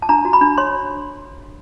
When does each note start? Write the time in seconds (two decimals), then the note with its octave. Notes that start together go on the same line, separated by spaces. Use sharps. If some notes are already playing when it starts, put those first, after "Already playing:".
0.02 A5
0.09 D4 A#5
0.25 F#4
0.33 B5
0.41 D4
0.58 C#5 C6